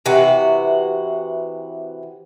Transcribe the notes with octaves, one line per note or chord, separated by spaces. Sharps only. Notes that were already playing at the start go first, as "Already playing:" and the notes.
C3 E3 F#4